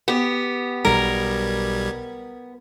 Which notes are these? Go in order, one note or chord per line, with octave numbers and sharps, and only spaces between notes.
B3 G4
B1 G3 A#4 G#6